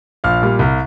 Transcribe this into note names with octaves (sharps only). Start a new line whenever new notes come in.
A#1 F5 F6
A#2 G3
C2